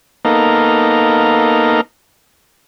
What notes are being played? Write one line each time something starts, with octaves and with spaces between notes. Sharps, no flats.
A#3 B3 D#4 A4 F5 A#5